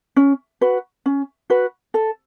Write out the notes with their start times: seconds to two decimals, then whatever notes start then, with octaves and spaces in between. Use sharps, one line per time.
0.16 C#4
0.61 F#4 B4
1.06 C#4
1.50 F#4 B4
1.94 A4